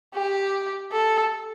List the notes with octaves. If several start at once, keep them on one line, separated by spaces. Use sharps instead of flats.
G4
A4